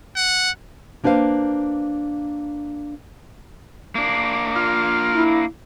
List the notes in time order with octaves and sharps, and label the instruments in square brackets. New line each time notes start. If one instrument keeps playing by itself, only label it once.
[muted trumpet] F#5
[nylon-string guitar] A#3 D4 B4 C5 F5
[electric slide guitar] A#3 D4
[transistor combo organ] F4
[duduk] E4